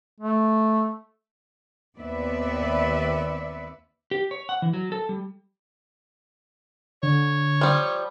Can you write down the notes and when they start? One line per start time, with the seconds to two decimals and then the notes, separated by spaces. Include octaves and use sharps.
0.20 A3
1.98 D#2 B3 C4 B4 D5 E5
4.11 G4
4.31 C#5
4.49 F#5
4.62 E3
4.73 F#3
4.92 A4
5.09 G3
7.03 D3 C#5
7.61 F3 G3